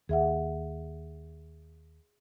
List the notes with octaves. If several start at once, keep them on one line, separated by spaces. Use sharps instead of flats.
D#2 G#4 E5 F#5